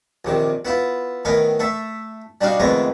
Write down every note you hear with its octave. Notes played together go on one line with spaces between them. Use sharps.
A#1 C3 D#3
B3 E4 F4
A2 D#3 B3 A#4 G#5
A3 A4 E5
G3 D4 D#4 F#4 F5
F2 D#3 G#3 A3 B3 A#5